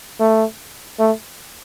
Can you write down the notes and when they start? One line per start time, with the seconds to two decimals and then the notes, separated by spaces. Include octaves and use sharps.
0.20 A3
0.99 A3